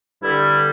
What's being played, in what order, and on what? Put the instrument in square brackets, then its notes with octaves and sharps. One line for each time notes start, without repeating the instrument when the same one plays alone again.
[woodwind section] G2 D3 G3 E4